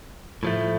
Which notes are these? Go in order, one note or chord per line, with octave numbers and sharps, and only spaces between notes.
A2 F3 A3